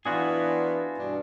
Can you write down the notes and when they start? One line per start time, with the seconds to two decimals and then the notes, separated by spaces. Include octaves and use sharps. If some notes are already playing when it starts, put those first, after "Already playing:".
0.06 E3 B3 D4 F4 F#4 G#4
0.98 G2 B2 D4